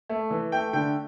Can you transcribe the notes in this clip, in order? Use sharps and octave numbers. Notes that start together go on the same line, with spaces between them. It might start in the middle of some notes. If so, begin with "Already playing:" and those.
A3
E3
A3 G5
D3 G5